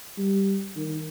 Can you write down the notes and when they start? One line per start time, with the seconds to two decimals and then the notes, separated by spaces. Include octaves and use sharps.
0.18 G3
0.76 D#3